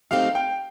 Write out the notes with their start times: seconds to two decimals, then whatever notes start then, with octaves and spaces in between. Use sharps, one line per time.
0.11 F#3 A3 C4 D#4 G4 F5
0.35 G5